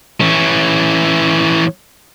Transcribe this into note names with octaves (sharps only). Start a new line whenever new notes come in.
E3 C#4